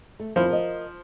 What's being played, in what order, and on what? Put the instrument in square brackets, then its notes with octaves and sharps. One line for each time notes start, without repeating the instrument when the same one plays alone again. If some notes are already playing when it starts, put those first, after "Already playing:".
[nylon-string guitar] A3
[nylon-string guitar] F2 D#3 E4 [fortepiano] F3
[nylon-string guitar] A#4 D#5